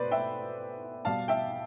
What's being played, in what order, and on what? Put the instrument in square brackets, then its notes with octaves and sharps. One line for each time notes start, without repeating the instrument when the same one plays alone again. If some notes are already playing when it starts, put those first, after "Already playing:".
Already playing: [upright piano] B2 A3 B4 C5 D5
E5 G5
B2 G3 F5 A5
E5 G5